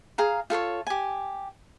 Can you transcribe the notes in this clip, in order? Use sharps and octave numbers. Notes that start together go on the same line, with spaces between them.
G#4 F5 A#5
F4 A4 C5 C#5
G4 G#5